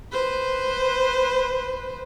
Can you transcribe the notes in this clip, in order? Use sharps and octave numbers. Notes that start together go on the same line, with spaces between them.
B4 C5